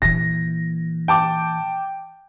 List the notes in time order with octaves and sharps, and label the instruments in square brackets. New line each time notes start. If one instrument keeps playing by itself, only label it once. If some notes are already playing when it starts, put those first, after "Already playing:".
[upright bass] A#2 E3 [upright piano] A#6
[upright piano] G5 A5 D6